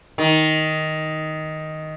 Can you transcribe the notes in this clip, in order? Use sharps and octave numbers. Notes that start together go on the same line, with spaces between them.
D#3